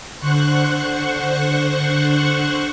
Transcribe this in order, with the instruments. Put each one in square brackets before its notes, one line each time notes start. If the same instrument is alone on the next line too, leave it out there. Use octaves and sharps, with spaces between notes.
[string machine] D3 C5 F#5 C#6 F#6